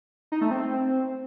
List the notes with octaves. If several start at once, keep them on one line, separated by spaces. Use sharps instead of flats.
D#4
A3
C4